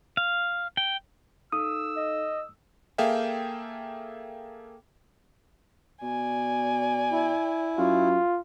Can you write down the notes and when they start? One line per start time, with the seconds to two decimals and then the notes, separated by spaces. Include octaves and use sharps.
0.17 F5
0.77 G5
1.52 D#4 A4 F5 D#6 E6
1.96 D#5
2.98 A#3 G#4 A4 E5 F5 G5
6.02 B2 D5 G#5
7.12 E4
7.78 F#2 F4